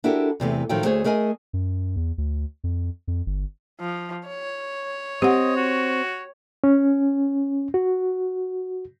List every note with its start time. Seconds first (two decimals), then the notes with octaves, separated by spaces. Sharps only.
0.04 D4 E4 F#4 G4 A4 A#4
0.40 E2 C3 E3 A3
0.69 A2 D#3 F3 F#3 A3 G5
0.85 D2 A3 G#4 C5 C#5
1.04 A3 G#4 A#4 D#5 G#5
1.53 F#2
1.96 E2
2.18 D2
2.64 F2
3.08 F2
3.26 G1
3.81 F3
4.28 C#5
5.22 C4 G4 D#5 F#5
5.57 F#4
6.64 C#4
7.74 F#4